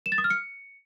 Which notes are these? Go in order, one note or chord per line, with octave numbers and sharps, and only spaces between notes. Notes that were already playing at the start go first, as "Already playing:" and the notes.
E7
A6
D#6
F6
C#7